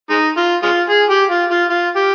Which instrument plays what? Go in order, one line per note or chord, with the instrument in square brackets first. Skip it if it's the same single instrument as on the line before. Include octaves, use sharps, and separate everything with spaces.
[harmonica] G#3 D#4
F4
G#3 F4
G#4
G4
F4
F4
F4
G4